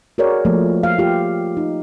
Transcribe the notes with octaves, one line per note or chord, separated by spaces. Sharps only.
F#4 G#4 A#4 C#5 D5
F3 A3 A#3
F5
F4 G4
D#4